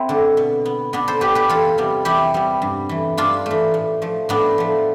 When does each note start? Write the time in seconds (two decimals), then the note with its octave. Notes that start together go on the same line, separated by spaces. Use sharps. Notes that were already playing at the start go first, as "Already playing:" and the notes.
Already playing: C4 E4
0.09 D3 A3
0.37 B2
0.66 B3
0.93 B2 B3 D4
1.08 A4 C5
1.21 B3 G4 B4
1.35 G4 B4
1.49 E2 F4 A4
1.78 C3 G3 B3
2.05 E2 E4 G4
2.34 C3 G3 B3
2.62 G2
2.89 E3 A3
3.17 G2 D4 F4
3.46 E3 A3
3.74 A2
4.02 F3 A3
4.29 A2 B3 D4
4.58 F3 A3